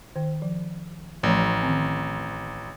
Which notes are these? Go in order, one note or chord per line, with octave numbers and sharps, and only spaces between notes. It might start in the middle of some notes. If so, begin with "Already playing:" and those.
D#3 C5 G5
F3
A1 F3 A3 C#5
D#3 C4